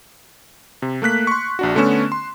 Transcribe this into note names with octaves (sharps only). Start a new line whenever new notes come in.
C3
A3 A#3 F#6 B6
C6 C#6
A#1 D4 F#4
D3 A3 B3 C#4 C#6 E7
C6